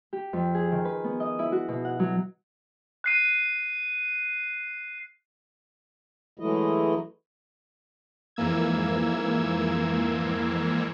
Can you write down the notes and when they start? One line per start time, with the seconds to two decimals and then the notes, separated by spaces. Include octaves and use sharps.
0.13 G4
0.33 F2
0.55 G#4
0.71 D#3
0.85 B4
1.04 B3
1.20 D#5
1.39 E4
1.52 F#4
1.68 B2
1.85 F#5
1.99 F#3
3.04 F#6 C7 D#7
6.39 E3 F#3 G#3 A3 E4 D#5
8.36 F2 G#2 E3 A#3 E6 G#6